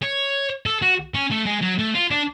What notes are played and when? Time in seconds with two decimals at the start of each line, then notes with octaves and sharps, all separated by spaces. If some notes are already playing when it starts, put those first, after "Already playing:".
0.02 C#5
0.66 A4
0.82 F#4
1.14 C#4
1.31 A3
1.46 G#3
1.62 F#3
1.79 A3
1.95 F4
2.11 D4